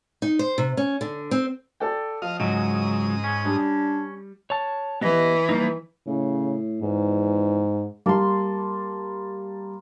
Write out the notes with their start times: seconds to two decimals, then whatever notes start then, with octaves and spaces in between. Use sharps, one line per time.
0.22 D#4
0.39 C5
0.58 C3
0.77 C#4
1.01 D3
1.31 C4
1.80 A4 D5 G5
2.22 F3 D#5 F5
2.40 C#2 G#2 F#3 D#4 D#6
3.24 C#4
3.45 G3 D4
4.50 C#5 A5
5.01 E3 B3 G4 D#5
5.49 G3 A#3 D#4
6.07 A2 C#3
6.82 E2 G#2
8.06 G3 A#3 A5 C6